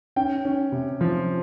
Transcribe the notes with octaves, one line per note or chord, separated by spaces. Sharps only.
C#4 G5
C#4
C3
F3